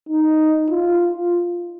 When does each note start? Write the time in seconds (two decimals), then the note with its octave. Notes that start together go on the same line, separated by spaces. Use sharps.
0.09 D#4
0.70 F4